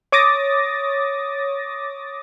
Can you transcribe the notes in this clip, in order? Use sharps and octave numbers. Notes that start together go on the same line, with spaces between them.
C#5 D6 D#6 A6 A#6